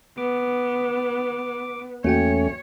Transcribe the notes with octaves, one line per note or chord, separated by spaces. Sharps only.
B3 D6
E2 A3 A#3 C#4 F#4 C#5 G5